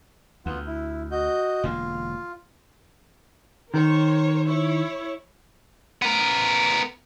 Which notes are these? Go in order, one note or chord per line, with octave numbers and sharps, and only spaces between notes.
D2 B3 F4 F#5
E4
F#4 D#5 G6
E1 D3 A#3 F4
D#3 A#4 C5 C#5
E4 C#5
B3 A#4